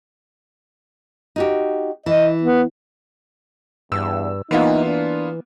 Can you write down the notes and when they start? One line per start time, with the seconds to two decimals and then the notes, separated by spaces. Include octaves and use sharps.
1.36 D#4 F#4 G4
2.06 E3 D#5
2.43 B3
3.92 E2 G2 E6
4.51 E3 A#3 B3 D#4 F4
4.86 D4